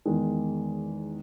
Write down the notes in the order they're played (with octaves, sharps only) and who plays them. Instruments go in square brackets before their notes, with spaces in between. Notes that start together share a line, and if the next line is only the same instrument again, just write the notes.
[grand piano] E2 D#3 G#3